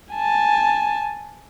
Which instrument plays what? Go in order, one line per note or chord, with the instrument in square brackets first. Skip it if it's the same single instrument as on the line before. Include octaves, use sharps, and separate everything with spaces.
[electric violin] G#5 A5